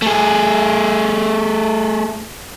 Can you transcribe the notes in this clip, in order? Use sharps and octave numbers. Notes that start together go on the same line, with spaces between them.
A3 G#4